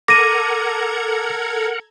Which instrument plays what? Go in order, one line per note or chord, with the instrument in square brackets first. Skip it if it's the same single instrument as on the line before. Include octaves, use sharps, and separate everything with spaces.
[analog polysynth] A4 A#5 G#6 [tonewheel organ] A#4 F#5 [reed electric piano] D6 [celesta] A#6 D#7